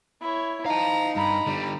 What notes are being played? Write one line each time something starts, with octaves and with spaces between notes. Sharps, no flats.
E4 C#5
D#4 F5 A5 A#5
G2 A#5 B5
D3 G3